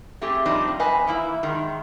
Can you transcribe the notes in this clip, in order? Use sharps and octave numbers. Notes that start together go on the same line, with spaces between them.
A3 C4 G4 G#4
A#2 F3 G3 C4 D4 D#4
G3
F#2 C4 B4 D#5 G#5
E3 A#3 E4
G#2 D#3 G#3